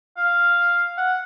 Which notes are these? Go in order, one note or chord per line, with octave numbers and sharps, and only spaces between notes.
F5
F#5